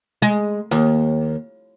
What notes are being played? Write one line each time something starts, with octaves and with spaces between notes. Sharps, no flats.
G#3
D#2